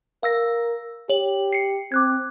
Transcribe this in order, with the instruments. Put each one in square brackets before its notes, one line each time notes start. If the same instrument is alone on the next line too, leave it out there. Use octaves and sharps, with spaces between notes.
[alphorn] A#4 [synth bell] F5 E6 A#6
[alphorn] G4 [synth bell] C#5 F#7
[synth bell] C7 C#7
[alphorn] C4 [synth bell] D6 F#6 G#6